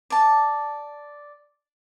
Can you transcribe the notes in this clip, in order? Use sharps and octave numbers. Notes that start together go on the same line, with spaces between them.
D5 A5